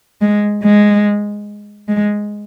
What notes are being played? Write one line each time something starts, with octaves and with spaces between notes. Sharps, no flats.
G#3
G#3
G#3